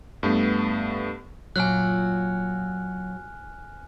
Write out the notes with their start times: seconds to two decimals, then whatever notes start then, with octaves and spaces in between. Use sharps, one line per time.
0.23 G2 A3 B3
1.56 F#2 A#2 F#3 F4 G#5 F6 F#6